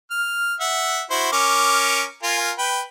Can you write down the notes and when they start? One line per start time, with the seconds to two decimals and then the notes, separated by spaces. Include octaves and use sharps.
0.11 F6
0.60 E5 F#5
1.11 E4 F#4 C5
1.32 C#4 A#4 D6
2.23 F4 A#4 G#5
2.58 B4 G5